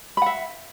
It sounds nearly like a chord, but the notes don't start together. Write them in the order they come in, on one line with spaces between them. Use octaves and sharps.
B5 F#5 E5